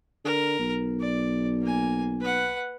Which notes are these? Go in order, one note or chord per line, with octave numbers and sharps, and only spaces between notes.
D3 A#4
B1
D5
A#3 G#5
B4 F#5